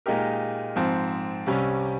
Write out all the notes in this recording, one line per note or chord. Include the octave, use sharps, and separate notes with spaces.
A#2 G#3 D#4 G4 A#4
G#2 F3 C4
C2 C3 G3 C#4